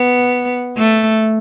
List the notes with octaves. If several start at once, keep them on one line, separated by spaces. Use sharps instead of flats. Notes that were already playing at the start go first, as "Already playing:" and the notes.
Already playing: B3
A3